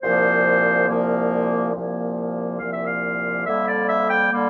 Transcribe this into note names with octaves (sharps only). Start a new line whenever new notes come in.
C2 A#2 F3 A#3 C5
C2 A#2 F3 A#3
C2 A#2 F3 A#3
C2 A#2 F3 A#3 F5
E5
F5
F2 D3 G3 A#3 E5
D5
E5
G5
D3 G3 A#3